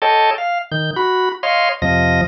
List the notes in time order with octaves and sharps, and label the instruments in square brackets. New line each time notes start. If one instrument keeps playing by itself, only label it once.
[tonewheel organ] A4 C#5 D#5 G5 A5
F5
D#3 G6
F#4 B5
C#5 D#5 F5 C6
F2 C3 F3 D#5 A#6